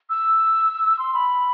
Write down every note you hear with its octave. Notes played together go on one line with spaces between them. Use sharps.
E6
C6
B5